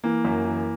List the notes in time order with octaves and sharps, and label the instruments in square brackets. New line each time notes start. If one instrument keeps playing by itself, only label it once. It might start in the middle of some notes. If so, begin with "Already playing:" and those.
[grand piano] E3 A#3
F#2
E3